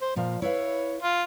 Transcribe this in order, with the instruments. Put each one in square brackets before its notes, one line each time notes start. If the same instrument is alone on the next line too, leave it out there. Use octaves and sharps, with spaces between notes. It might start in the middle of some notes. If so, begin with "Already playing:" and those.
[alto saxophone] C5
[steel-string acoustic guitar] A#2 F5 [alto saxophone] F3
[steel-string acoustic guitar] E4 B4 F5 [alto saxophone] C#5
[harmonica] F4